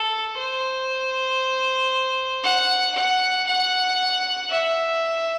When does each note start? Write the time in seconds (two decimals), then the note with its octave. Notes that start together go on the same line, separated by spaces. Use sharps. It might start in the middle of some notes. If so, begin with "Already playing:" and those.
Already playing: A4
0.37 C5
2.44 F#5
2.95 F#5
3.47 F#5
4.50 E5